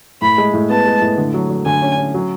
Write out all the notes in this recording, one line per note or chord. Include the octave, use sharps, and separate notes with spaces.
A2 B5
G#3
A2
B3 A5
G#3
A2
D3
F#3
F#3
D3 G#5
C#4
C#4
F#3